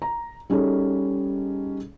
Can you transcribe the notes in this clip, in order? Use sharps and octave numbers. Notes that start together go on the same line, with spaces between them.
A#5
G3 C#4 D#4 G#4 A4